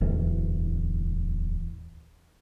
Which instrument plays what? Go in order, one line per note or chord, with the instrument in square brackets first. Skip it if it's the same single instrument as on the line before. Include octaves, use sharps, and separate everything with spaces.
[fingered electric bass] D1 E2